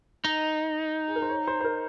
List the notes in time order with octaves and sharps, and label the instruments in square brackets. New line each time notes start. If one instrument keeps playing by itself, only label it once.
[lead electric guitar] D#4 [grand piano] D#5
[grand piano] G#4
A#4
C5
C#5
C5
C5
A#4